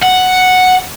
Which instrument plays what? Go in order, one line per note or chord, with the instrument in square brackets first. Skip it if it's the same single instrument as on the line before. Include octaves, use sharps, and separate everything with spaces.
[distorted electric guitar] F#5